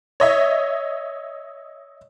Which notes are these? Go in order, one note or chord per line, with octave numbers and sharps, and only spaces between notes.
C#5 D#5 E5